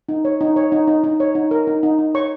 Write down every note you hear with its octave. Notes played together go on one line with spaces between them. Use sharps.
D#4
C#5
D#4
C#5
D#4
D#4
D#4
C#5
D#4
A#4
D#4
D#4
D#4
C#5 C#6